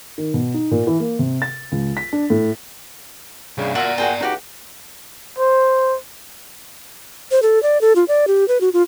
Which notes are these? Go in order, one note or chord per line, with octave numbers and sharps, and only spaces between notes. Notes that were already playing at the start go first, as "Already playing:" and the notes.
D#3
B2
D#4
A#2
E3
A#3
C3
A6
C#2
B6
D4
A2
C2 G2 C#3
A#2 F#4 D5 E5 F5 A#5
A#2 F#4 G#4 G5
C#2 D#4 F#4 G4
C5
C5
A4
D5
A4
F4
D5
G4
B4
F#4
F4